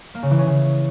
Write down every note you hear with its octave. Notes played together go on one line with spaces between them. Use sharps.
A#3
C#3
E3
C#4
C#3